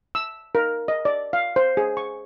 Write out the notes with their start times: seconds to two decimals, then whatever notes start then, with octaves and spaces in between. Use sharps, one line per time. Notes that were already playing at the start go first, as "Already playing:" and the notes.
0.15 E6
0.55 A#4
0.88 D#5
1.05 D5
1.33 F5
1.56 C5
1.77 G#4
1.97 C#6